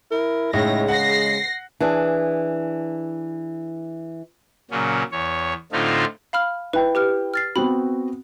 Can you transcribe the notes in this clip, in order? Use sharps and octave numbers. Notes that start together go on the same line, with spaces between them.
E4 A#4
A2 C#3 G#3 D#4 E4 A#6
F#5 A#6 C7
E3 D4 G#4
A#2 C#3 F#3 C#4
E2 C#5
A2 D3 A3 C4 D#4 F4
F5 B5 F6
E4 B4 G5
G4 B4 F6
F6 A6 C7
B3 C4 F#4 B5